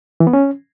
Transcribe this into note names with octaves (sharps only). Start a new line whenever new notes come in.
E3
B3
C#4